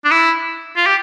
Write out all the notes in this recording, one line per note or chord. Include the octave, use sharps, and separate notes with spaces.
D4
E4
F4
G4